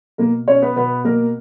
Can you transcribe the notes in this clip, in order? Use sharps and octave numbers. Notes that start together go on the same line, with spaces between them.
B2 A#3 A#4
B2 C#4 C#5
B3 B4
B2 B3 B4
B2 A#3 A#4